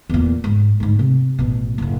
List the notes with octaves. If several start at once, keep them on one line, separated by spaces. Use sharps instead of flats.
E2 A#2
G#2
G#2 G#3
C3
A1 B2
F#1 A2